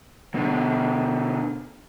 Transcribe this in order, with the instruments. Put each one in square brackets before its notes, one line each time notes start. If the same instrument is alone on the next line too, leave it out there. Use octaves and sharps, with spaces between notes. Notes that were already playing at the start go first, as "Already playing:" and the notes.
[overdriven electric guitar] B2 D3